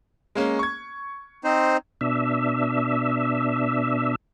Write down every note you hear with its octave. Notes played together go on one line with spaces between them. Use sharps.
G#3 A#3 C#4
C#6 G#6
C4 D#4 C5
B2 D4 E5